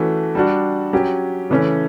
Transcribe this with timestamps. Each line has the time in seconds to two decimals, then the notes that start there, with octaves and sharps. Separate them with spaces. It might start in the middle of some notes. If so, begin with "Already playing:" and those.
Already playing: E3 A3 C#4 F#4
0.35 G3 D4 F#4
0.93 F#3 C#4 G4
1.50 C#3 E3 A3 C#4